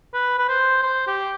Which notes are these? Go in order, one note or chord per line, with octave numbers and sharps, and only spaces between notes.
B4
B4
C5
C5
G4